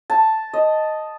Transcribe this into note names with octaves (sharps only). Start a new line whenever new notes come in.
A5
D#5